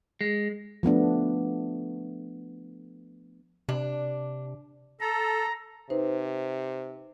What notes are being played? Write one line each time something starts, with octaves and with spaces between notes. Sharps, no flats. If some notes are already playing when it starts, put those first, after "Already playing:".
G#3
F3 A3 B3 D4
C3 D4
A4 A#5
C3 D#4 B4 C5